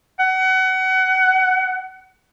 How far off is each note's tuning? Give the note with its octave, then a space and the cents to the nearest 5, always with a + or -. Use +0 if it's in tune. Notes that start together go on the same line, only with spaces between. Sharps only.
F#5 +30